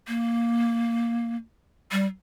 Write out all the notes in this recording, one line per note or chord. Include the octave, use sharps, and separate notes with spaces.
A#3
G3